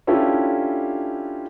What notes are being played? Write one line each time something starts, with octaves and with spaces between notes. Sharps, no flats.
C#4 D4 E4 F4 G4 A4